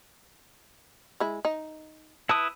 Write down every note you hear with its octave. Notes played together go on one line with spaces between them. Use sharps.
G#3 E4
D#4
E4 B4 A5 D#6